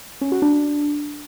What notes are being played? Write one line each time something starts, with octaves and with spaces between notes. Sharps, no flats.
C#4
F#4
D4